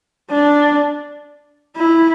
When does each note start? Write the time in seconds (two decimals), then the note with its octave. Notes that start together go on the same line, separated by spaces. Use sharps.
0.30 D4
1.77 E4